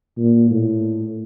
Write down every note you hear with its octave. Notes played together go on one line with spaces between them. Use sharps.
A#2
A2